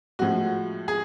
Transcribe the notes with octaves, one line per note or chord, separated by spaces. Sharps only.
A2 F3 G#3 F#4
G#4